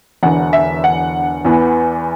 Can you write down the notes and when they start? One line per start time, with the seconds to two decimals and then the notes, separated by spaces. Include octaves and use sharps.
0.23 E1 E2 D3 F#5
0.53 E5
0.84 F#5
1.45 E2 E3 B3